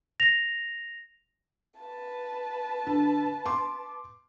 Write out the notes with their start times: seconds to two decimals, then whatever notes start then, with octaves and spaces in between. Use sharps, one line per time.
0.20 A#6 F7
1.79 B4 A5
2.87 D3
3.46 C6 D6